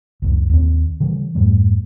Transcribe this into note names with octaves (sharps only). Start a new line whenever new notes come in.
C#2 F#2
D#2 A3 C4
C#3 E3 G3
F2 G#2 G3 A3